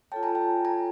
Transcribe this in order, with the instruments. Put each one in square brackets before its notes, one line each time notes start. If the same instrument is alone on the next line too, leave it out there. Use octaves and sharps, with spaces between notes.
[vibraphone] F4 A4 C#5 [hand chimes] G5 A5
[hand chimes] G#5 A#5
G5 A5
G#5 A#5